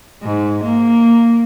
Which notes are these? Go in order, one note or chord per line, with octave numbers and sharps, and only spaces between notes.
G#2
A#3